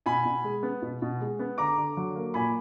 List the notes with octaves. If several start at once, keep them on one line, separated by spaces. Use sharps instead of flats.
B2 G#5 B5
B2
G#3
B3
B2
B2
G#3
B3
D3 A#5 D6
D3
F#3
A#3
A#2 G#5 B5